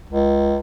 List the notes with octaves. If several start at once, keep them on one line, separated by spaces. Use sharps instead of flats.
C#2